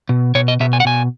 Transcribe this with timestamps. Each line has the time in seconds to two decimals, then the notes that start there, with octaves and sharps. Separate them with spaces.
0.09 B2
0.35 B2 C#5
0.48 D#5
0.60 B2 E5
0.73 G#5
0.80 F#5
0.85 B2 G#5